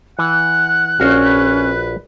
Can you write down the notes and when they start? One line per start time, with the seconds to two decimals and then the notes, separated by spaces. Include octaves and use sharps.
0.19 E3 F#5 F#6
1.00 A#1 C#4 F#4 F5
1.24 B4